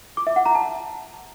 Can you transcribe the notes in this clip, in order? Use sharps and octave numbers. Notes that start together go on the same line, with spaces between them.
D6
E5
F#5
A#5
A5